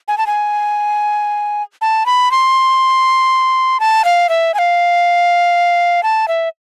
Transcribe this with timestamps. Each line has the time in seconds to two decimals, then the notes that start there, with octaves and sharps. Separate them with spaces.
0.08 G#5
0.18 A5
0.27 G#5
1.81 A5
2.06 B5
2.31 C6
3.80 A5
4.05 F5
4.29 E5
4.54 G#5
4.59 F5
6.03 A5
6.28 E5